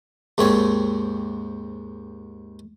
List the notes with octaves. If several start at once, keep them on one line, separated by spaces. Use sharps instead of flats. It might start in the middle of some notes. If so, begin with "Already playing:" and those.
D#2 G#2 C4 C#5